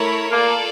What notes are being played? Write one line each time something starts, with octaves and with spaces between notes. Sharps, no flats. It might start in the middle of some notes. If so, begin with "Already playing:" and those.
Already playing: A3 E4 A#4 C#5
A#3 F4 A4 D5